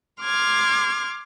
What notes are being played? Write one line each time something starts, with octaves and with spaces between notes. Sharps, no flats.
C6 D6 F6 G#6